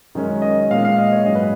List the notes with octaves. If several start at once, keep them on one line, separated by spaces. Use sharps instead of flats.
F#2 D#3 G#3 C#4
D#5
A#2 G#3 B3 F5
F5
D#5
C#5
G#2 F#3 C#4 D#5
B4